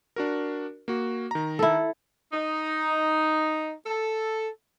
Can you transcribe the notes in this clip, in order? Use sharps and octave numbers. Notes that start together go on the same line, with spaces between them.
D4 F#4 A#4
A#3 F#4
D#3 A#5
E4 A4
D#4
A4